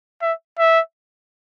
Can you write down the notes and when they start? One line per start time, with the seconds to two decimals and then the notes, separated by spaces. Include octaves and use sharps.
0.22 E5
0.58 E5